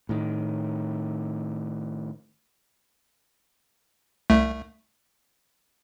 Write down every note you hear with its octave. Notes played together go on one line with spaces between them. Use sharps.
A2 D#3
C2 A3